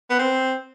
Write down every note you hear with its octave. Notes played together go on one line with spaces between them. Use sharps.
B3
C4